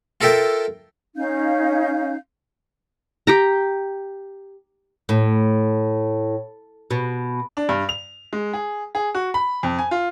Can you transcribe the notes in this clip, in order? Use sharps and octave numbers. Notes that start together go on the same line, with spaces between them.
F4 A4 A#4 E5 G5
C#4 D#4 F5 G6
G4 G5 A#5
A2
B2
D4
G2
F7
G#3
G#4
G#4
F#4
B5
F2
G#5
F4